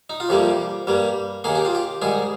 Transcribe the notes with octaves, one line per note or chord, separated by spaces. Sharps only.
D#4
F4
F2 C3 G3 A#3 G4
G2 G3 A#3
D#2 D#3 A#3 G#4
G4
F4
G4
G#2 D#3 G3 G#4